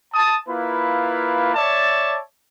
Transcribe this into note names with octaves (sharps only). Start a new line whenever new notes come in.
A5 D#6
A#3 E4 F4 B4
C#5 D5 E5 A5